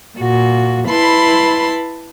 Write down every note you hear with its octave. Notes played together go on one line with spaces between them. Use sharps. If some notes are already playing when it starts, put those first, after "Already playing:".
A#2 F#4
E4 B4 A5 B5 C6